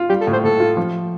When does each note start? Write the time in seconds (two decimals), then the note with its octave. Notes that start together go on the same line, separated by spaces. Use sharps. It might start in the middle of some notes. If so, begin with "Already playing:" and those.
Already playing: F4
0.09 G3 G4
0.21 A4
0.27 A2
0.33 C5
0.44 A2 A4
0.60 F4
0.77 F3